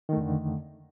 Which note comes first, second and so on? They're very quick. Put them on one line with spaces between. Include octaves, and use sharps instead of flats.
D#3 A3 F2 D3